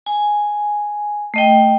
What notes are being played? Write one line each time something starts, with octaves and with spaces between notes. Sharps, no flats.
G#5
A3 D#5 G5